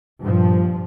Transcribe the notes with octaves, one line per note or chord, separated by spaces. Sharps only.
G2 A#2 F3